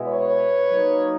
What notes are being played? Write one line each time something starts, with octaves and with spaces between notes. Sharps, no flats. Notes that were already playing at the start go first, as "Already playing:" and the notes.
Already playing: B2 G#3 B3 E4
B4 C#5
F#3 A#3 D#4